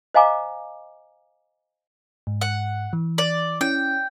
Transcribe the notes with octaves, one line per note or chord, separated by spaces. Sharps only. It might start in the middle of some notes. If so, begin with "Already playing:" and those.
C5 D#5 F5 G#5 A#5 D6
G#2
F#5
E3
D5
C#4 E4 G5